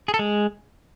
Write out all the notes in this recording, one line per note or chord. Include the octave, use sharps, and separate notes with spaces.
G#4
A4
G#3